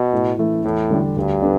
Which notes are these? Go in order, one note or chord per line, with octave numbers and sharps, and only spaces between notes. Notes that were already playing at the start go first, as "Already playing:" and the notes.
Already playing: B2
A2
E3 A3 E4
E2 A2
D3 G3 D4
D2 G2
D3 B3 D4